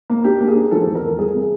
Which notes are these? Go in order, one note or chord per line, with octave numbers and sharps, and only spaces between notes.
A#3
D4 G4
A#3
G#4
D4
F3 A4
E2
A#4
E2
G3 G#4
C3
G#4